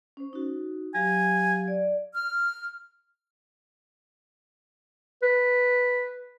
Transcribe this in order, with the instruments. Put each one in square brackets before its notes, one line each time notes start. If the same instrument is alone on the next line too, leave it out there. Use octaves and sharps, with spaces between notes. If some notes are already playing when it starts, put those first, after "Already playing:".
[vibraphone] C#4 C5
D#4 F#4
[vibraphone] F#3 G4 F5 [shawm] G#5
[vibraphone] D5
[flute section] F6
[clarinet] B4